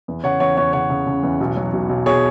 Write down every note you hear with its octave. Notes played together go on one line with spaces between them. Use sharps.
E2
C#3 C#5 F#5
E2 C#5 F#5
E2 C#5 F#5
C#3 C#5 F#5
C#3
C#3
E2
B1
F#3
B1
B1
B2 G#4 C#5